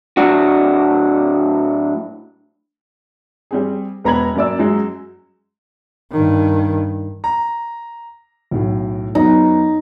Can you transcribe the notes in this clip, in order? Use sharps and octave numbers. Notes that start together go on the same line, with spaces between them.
A2 F#3 D4 F#4
G3 C4 G#4
E1 B3 A#5 B5 G#6 F#7
F#2 A#3 D5 E6
F#2 F#3 G#3
G2 D#3
A#5
B1 A2
F#2 B3 D#4